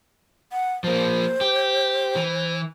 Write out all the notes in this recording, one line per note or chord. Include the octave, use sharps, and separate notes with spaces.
F#5
F3 A#3 C5
G4
E3